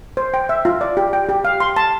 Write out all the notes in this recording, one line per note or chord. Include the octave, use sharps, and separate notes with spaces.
C5
G5
E5
F4
D5
G4
G5
G4
F5
C6
A5